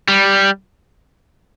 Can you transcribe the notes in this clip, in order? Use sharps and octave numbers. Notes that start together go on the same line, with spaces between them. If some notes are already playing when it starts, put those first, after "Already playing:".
G3